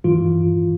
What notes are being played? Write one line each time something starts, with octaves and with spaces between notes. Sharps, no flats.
G2 E3 F4